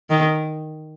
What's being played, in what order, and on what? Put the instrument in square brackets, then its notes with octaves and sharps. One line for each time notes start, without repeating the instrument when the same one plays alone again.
[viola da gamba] D#3